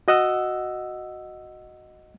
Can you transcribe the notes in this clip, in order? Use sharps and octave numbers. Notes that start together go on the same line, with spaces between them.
F#4 D#5 F#5 E6